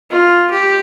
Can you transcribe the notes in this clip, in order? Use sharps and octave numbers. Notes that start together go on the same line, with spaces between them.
F4
G4